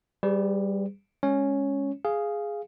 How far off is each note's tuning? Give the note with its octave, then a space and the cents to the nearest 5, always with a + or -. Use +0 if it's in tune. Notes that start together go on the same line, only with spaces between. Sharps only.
G3 +0 G#4 -30 B4 +45
G#3 +0 C#4 +0 C#5 +0
G#4 +0 F5 -5